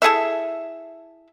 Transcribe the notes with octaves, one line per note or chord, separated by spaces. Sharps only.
E4 G#4 A4 E5